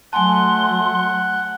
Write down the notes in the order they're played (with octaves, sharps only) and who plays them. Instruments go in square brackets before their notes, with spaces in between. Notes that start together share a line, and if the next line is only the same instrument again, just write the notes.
[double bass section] F#3 A3 [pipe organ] F#5 [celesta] G#5 A5 [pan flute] C6